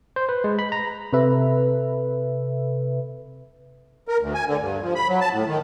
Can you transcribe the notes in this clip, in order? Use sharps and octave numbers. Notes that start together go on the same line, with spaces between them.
C5
B4
G#3
B5
A#5
C3 A4 B4 E5
A#4
D2
G#5
D3
G2
F3
B5
F#3
A5
A2
D#3